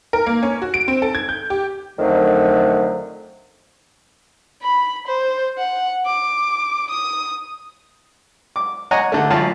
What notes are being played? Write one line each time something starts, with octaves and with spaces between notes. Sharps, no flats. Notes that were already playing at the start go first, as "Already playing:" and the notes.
A#4
A#3
C#4
F#4
D7
C4
A4
G#6
G6
G4
F2 D3 D#3 F#3 A3
B5
C5
F#5
D6
D#6
D6
C#5 D#5 F#5 G#5 A#5
D3 A3
A1 F#2 F4 A5